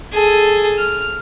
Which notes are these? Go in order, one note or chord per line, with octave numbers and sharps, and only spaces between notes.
G#4 A4
F6